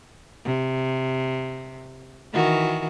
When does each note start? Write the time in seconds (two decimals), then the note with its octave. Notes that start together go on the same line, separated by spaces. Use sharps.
0.45 C3
2.33 D#3 E3 F#4